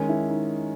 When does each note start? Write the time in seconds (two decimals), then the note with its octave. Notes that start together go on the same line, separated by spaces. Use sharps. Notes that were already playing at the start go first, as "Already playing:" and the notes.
Already playing: D#3 G#3 C#4
0.09 E4
0.29 D#4